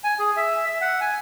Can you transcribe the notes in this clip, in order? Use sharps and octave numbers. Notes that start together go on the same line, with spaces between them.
G#5
G#4
E5
E5
F#5
G#5